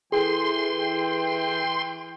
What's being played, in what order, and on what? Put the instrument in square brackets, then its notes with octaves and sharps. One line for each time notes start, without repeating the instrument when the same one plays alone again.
[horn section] E3 G5 [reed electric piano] G#4 A4 [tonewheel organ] C6